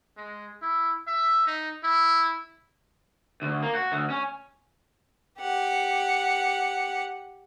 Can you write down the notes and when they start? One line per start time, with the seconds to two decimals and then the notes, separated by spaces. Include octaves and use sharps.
0.17 G#3
0.62 E4
1.07 E5
1.47 D#4
1.83 E4
3.42 D2
3.63 A#3
3.75 F#4
3.92 D2
4.10 C#4
5.40 G4 F#5